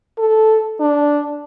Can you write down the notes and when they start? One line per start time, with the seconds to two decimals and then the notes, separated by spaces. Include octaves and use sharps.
0.18 A4
0.80 D4